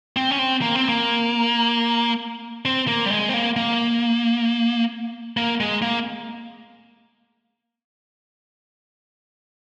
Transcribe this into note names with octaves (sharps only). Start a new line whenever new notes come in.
C4
C#4
C4
A#3
C4
A#3
C4
A#3
G3
G#3
C4
A#3
A#3
A#3
G#3
A#3